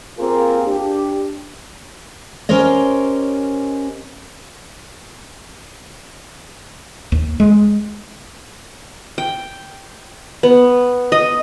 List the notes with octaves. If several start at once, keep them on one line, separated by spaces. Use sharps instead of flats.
A#3 C4 F4 G4 G#4 A#4
D4 G4
C#4 G4 A#4 C5 C#5 D#5
D#2
G#3
G5
B3
D#5